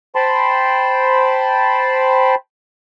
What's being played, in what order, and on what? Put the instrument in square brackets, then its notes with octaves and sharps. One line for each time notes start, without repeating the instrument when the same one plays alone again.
[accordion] C5 G5 A5 B5 C6